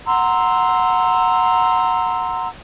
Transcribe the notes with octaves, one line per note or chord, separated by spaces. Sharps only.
F#5 A#5 C6 E6